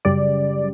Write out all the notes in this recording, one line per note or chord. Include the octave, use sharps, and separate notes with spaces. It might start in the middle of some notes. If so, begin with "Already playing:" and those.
F#2 C#3 G3 D5